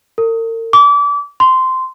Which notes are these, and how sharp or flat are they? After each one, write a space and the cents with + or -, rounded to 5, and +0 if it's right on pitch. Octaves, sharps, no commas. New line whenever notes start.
A#4 -45
D6 -30
C6 -10